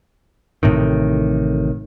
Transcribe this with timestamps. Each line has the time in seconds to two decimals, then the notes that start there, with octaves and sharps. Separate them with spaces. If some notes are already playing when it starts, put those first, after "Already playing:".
0.63 A1 A2 C3 D#3